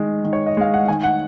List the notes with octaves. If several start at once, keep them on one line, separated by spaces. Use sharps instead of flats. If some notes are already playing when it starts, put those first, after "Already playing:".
Already playing: D#3 G#3
D#3
C#5
D#5
G#3 F5
F#5
D#3 G#5
F#5